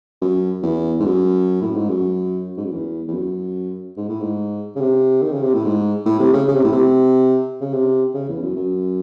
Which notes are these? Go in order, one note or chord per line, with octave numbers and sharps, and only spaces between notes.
F#2
E2
G#2
F#2
A2
G#2
F#2
G#2
F#2
E2
E2
F#2
G#2
A2
G#2
C#3
C3
D#3
C#3
C3
A2
G#2
A2
C3
C#3
C#3
C3
A2
C3
C#3
C3
C#3
E2
F#2
F#2